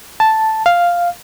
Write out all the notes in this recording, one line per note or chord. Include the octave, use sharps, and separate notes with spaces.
A5
F5